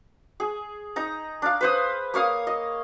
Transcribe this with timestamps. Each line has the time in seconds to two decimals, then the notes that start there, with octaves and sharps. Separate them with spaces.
0.40 G#4
0.96 D#4 A#5
1.42 D4 F5
1.61 B4 C5 D#6
2.14 A#3 C#5 F5 D#6
2.47 D#5